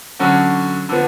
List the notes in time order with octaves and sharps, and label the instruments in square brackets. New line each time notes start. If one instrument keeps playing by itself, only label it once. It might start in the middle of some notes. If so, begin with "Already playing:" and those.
[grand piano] D3 F#3 C#4 F#4
D3 F3 B3